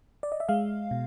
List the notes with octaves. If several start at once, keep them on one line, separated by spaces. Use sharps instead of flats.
D5
D#5
E5
G#3 F5
B2